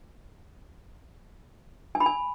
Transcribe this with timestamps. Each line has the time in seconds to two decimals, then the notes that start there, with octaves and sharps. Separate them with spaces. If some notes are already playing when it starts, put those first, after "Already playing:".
1.95 G#5
2.00 B5
2.06 G#5